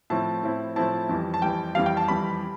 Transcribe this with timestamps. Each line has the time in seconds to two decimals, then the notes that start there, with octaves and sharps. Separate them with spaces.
0.10 A2 F3 C4 E4 A5
0.43 A2 F3 C4 E4
0.76 A2 F3 C4 E4 A5
1.09 F2 E3 G3
1.34 A5
1.42 F2 E3 G3 G5
1.75 F2 E3 G3 F5
1.86 G5
1.97 A5
2.08 F2 E3 G3 B5